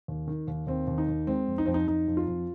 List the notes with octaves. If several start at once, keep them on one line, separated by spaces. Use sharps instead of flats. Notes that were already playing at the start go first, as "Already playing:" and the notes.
D#2
D#3
D#2
D#2 C4
D#2
D#4
D#2
G#3 C4
F2
D#4
F2 C4
D#4
F2 D#4
F2
F4
F2